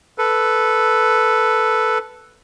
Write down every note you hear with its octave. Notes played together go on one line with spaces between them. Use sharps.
A4 B4